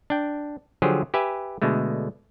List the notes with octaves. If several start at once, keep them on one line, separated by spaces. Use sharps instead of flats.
D4 G5
D3 F3 F#3 G4 G#4 C5
G4 B4 E5 G#5
B2 D3 G#3 A3